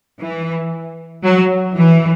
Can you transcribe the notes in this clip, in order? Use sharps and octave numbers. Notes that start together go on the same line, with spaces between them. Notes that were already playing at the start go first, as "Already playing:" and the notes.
E3
F#3
E3